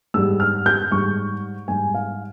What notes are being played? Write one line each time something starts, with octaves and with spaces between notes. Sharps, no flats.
G#2 G3 E6
F6
G6
G#2 G3 C#6
G#2 G3 G#5
F5